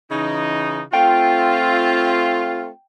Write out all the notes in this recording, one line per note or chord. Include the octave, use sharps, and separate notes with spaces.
C#3 E3 D#4
A3 C4 F4 G5